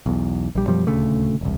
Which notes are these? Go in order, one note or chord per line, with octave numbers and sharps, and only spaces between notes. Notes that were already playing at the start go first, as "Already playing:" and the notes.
B1 E2
A#1 G3
F#2 B2 F3 G3
D#1 D2 C#3 A3
E1 C2